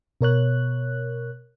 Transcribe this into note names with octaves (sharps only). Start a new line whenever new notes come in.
B2 A#4 C#5 F#6